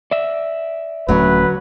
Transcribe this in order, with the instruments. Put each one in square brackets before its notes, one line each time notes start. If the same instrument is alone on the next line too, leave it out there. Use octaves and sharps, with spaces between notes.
[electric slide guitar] D5 E5
[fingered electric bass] D#1 A3 C#4 [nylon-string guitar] D3 F#3 [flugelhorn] B4